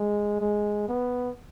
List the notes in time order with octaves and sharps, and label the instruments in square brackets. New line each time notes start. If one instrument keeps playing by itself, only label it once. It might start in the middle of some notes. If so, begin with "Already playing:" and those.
Already playing: [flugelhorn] G#3
G#3
B3